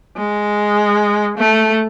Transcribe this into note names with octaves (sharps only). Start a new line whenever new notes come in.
G#3
A3